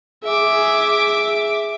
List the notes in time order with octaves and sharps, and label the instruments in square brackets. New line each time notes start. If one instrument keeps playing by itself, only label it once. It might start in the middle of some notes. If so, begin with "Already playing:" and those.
[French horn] G#4 [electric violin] E5 D6